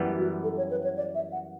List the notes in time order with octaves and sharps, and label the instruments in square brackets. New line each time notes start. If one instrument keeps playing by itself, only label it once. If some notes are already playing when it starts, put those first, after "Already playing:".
Already playing: [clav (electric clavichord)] F#2 E3 G3 B3
[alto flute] F#4
A4
C#5
B4
C#5
D5
E5
F#5